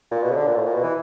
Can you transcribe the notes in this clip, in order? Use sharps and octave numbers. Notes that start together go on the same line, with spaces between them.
A#2
B2
C#3
D3
A#2
A2
A#2
B2
E3